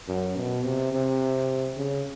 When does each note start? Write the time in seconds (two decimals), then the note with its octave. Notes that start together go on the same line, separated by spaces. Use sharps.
0.08 F#2
0.36 B2
0.64 C3
0.93 C3
1.77 C#3